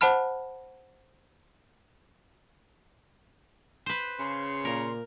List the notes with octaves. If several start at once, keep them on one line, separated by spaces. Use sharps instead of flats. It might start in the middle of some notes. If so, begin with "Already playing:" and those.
C5 F#5 A5 B5 F6
B4 C5
C#3 C6
A#2 A#4